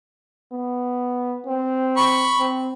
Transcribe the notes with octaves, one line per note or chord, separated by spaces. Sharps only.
B3
C4
B5 C#6
C4